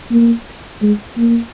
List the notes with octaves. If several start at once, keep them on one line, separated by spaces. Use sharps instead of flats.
A#3
G#3
A#3